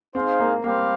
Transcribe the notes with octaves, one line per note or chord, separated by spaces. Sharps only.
C4 D#4 G#4 C5 F5
A#3
G3 A#3 C4 G4 C5 F5